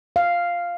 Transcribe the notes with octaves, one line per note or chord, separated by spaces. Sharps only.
F5